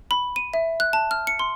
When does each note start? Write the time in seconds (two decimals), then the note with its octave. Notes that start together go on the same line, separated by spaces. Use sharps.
0.11 B5
0.36 D#7
0.54 E5
0.80 F#6
0.93 A5
1.11 F6
1.27 C#7
1.39 C6